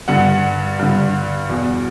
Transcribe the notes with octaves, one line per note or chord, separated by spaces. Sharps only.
G2 D3 F#5
G2 D3
E2 B2